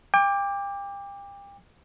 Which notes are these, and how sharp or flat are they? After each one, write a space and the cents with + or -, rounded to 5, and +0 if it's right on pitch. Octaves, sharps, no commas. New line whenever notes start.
G5 +35 D6 +0